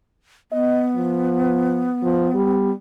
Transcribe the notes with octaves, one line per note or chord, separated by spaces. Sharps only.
B3 D#5
F3
F3
G3